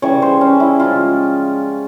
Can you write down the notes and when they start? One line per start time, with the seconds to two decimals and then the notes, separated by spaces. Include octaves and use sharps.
0.02 C#3 E3 G3 C#5
0.22 C5
0.41 C#4
0.60 E4
0.80 C#3 F3 G#3 F4